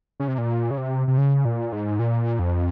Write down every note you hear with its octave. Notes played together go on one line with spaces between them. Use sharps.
C#3
C3
A#2
C#3
C3
C3
C#3
A#2
G#2
A#2
F2